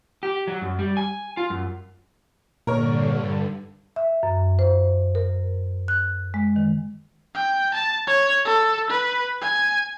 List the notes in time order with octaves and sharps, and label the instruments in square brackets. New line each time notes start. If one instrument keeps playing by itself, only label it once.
[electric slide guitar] G4
F#3
F#2
G3
G#5
F4
F#2
[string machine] G2 D3 [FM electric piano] A#2 [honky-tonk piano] A#4 C#5
[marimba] E5
F#2
C5
A#4
F#6
G#3
D#3
[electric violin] G5
A5
C#5
A4
B4
G#5